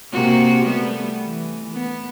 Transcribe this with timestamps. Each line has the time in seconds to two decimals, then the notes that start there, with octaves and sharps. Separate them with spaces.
0.13 C3 A#3 F#4
0.65 G3 A3 B3
1.22 E3
1.73 B3